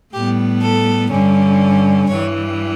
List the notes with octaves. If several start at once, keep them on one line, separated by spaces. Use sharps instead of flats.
A2 G3 B3 G4
A4
G2 D3 G3 C#4
G2 E3 G3 C#5